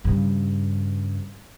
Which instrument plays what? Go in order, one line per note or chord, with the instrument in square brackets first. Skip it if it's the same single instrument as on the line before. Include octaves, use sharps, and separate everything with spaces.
[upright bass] G2 C#3